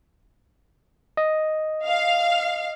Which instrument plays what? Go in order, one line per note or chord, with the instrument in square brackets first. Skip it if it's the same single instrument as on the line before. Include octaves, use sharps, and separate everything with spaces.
[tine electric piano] D#5
[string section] F5